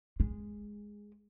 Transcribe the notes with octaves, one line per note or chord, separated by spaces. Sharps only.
G#3